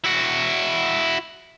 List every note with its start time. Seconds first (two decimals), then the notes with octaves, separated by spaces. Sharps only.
0.04 E4 F#4